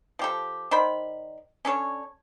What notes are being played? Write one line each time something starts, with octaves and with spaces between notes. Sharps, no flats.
F3 G4 A4
D#3 C5 D5 B5
C#4 D4 A4 C#5